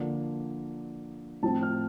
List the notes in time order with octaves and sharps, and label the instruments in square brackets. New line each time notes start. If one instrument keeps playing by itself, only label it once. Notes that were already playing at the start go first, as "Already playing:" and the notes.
Already playing: [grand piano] D3 F3 A#3 D4
A2 F3 C4 A5
F6